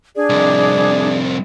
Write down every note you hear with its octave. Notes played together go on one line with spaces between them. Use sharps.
D4 G#4 D5
C2 F2